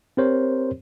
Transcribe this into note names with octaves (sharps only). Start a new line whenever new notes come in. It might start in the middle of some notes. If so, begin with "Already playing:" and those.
C4 G4 A#4 C5 C#5